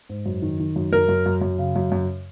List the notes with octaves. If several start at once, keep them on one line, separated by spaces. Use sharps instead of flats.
G#2
F#2
D#3
D#3
F#2
F#2 A#4
F#2
F#2
F#2
C#3
F#2
F#2